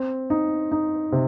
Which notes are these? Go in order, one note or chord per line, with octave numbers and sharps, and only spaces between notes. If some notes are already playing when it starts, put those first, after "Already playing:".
Already playing: C4
D#4
D#4
C3